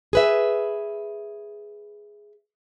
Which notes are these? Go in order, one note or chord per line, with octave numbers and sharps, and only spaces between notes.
G#4 B4 E5